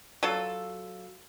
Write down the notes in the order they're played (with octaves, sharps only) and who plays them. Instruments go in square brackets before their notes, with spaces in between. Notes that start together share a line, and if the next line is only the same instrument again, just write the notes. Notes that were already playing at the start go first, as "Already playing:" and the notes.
[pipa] F#3 F4 A4